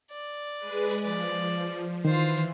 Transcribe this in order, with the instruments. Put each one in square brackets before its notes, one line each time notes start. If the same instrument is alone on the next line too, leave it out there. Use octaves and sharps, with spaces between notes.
[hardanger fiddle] D5
[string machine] G#3 G#4 B4
[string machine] F3 [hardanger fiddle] D5
[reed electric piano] D#3 [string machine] E3 [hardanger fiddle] F4 C5